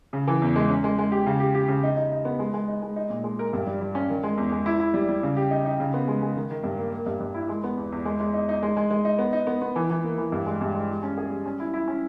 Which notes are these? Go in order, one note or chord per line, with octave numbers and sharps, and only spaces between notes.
C#3
E3
E2
G#3
C#4
G#3
G#3
G4
C#3
G4
G4
C#3
D#4
D#4
D#4
B3
G#3
G#3
D#4
G#3
D#4
A#2
G#3
A#4
G2
G3
G3
C#4
D#3
G#3
E2
G#3
E4
E4
G3
G3
C#3
G4
D#4
D#4
C#3
B3
G#3
G#3
D#3
D#3
G2
A#3
A#3
G2
G2
E4
G#3
B3
E2
E2
G#3
G#3
D#4
D#4
G#3
G#3
G#3
D#4
B3
D#4
B3
B3
E3
E3
A#3
E3
G2
G#3
G2
G#3
G3
C#4
G#4
G3
C#4
E4
E4
C#4